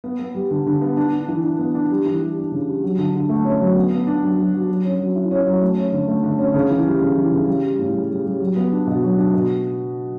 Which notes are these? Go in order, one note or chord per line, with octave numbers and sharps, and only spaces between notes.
B3
B3
G3
D3
D3
B3
D4
D4
E3
D4
B3
D4
G3
E3
G3
D4
C#3
G3
F#3
D3
D3
A3
C#4
F#3
B3
B3
D4
F#3
F#3
F#3
F#3
C#4
F#3
E4
C#4
F#3
A3
C#4
D3
A3
D3
C#4
C#3
E3
G3
C#3
E3
C#3
G3
G3
A2
G3
G3
G3
F#3
B3
D4
B2
F#3
D4
B2